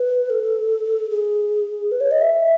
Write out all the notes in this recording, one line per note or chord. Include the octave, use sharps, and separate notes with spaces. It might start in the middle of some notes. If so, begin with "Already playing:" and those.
Already playing: B4
A4
G#4
B4
C#5
D#5
E5